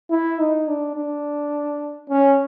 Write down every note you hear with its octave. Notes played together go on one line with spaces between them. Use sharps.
E4
D#4
D4
D4
C#4